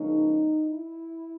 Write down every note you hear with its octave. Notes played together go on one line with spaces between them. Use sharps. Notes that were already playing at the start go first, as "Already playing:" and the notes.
Already playing: C#2 C#3 F3 A#3 C#4 D#4
E4